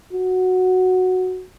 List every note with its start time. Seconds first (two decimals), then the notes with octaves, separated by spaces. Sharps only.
0.13 F#4